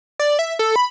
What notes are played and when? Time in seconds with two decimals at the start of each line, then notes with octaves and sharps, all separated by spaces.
0.19 D5
0.39 E5
0.59 A4
0.76 B5